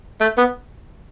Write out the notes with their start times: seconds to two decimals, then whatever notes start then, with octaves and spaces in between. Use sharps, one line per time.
0.20 A3
0.38 B3